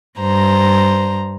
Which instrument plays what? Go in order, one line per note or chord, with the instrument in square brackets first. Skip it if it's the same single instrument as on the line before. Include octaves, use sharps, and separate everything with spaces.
[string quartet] G2 C5 A#5